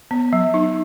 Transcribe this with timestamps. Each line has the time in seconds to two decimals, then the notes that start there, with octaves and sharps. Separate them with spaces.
0.11 B3
0.33 F#3
0.54 D#4